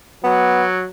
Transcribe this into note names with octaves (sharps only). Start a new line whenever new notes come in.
F#3 B3